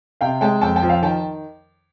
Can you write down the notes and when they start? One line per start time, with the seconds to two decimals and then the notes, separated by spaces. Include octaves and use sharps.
0.21 C3 F5 G5
0.41 G#3 G5 A5
0.61 F2 G5 A5
0.76 G5 A5
0.82 F3
0.89 F5 G5
1.02 D#3 G5 A5